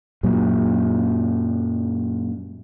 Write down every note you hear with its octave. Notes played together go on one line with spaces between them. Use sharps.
F#2 A#2 F#3